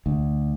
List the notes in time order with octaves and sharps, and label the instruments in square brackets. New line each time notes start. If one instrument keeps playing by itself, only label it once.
[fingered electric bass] D2